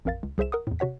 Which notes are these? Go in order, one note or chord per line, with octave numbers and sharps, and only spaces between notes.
A1 F2 A#4 F5 A6
C#2
C2 G#4 C5 E5 E7
A#4 F#5 D#6
E2 A2
C3 F#4 C#5 F#5 B6